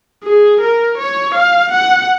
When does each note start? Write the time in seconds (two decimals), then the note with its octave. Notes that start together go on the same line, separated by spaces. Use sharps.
0.24 G#4
0.60 A#4
0.98 C#5
1.34 F5
1.72 F#5